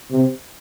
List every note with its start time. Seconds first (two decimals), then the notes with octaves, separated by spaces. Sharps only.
0.11 C3